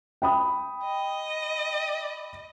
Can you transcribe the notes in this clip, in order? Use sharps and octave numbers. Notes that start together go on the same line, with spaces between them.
G5 B5 D#6
D#5